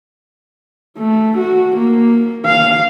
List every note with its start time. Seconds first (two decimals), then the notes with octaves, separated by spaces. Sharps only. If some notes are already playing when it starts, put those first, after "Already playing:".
0.98 A3
1.38 F#4
1.77 A#3
2.45 F5